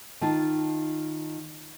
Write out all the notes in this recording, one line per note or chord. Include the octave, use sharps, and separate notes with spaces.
D#3 F4 A5